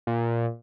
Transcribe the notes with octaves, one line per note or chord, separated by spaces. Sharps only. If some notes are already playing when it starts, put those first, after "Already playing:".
A#2